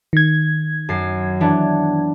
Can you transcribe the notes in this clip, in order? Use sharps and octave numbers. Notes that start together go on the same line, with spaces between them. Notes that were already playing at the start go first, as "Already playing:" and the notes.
D#3 G#6
F#2 A6 C7
E3 B3 D4